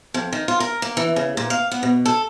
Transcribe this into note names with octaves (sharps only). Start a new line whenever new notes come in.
F2
D#3
F4
A#4
A#3
E3
C#3
A#2
F5
B3
B2
A4